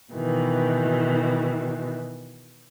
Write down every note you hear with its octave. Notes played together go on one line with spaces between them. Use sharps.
B2 D#3 E3